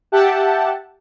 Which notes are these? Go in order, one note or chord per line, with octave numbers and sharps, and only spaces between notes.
G4 E5 F#5 G5 A5